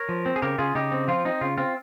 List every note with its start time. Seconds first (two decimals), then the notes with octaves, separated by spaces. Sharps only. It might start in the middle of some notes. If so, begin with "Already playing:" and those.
Already playing: A#4 C#5
0.09 F3
0.26 C4
0.36 G#4
0.42 C#3 G4 A#4
0.58 C#3 F4 G#4
0.75 C#3 D#4 G4
0.92 C4
1.08 F3 F4
1.25 C4 D#4
1.41 C#3 F4
1.58 C4 F4